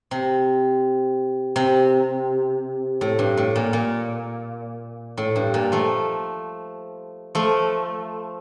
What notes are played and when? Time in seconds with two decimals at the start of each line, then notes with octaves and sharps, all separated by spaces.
0.11 C3
1.56 C3
3.01 A2
3.19 G2
3.37 A2
3.56 A#2
3.73 A#2
5.18 A2
5.36 G2
5.54 A#2
5.72 F3 A3
7.35 F3 A3